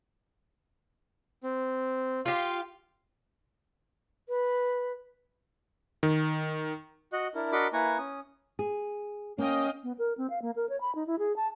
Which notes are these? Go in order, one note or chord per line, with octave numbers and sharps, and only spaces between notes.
C4
F4 G4 F5 C6
B4
D#3
F#4 D#5 F#6
D4 E4 A#4
D4 F#4 A#4 D#5 B5 D6
A#3 E4 B4 G#5 A#5 C#6
C#4 D#6
G#4
A#3 C#4 D#5 F5 G5
B3
A#4
C4
F5
A#3
A#4
C#5
B5
D#4
E4
G#4
A5